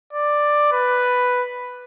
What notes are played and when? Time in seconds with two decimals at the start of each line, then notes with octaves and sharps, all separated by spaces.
0.13 D5
0.72 B4